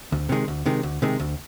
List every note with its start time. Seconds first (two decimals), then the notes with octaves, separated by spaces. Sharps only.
0.12 D2
0.29 C3 D#3 G#3
0.48 D2
0.66 C3 D#3 G#3
0.83 D2
1.02 C3 D#3 G#3
1.20 D2